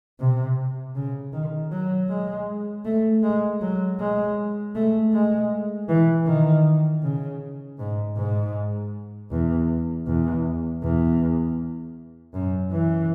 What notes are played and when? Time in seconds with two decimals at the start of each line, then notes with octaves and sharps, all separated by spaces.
0.20 C3
0.95 C#3
1.33 D#3
1.72 F#3
2.09 G#3
2.85 A3
3.23 G#3
3.61 F#3
3.99 G#3
4.75 A3
5.13 G#3
5.89 E3
6.27 D#3
7.03 C#3
7.79 G#2
8.17 G#2
9.31 E2
10.07 E2
10.83 E2
12.34 F#2
12.72 E3